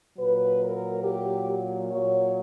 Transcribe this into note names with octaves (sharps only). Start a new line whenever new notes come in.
A#2 F#3 B4
A#4
G4
A#2 F#3 C#5